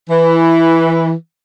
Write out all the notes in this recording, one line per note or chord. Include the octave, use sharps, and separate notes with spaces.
E3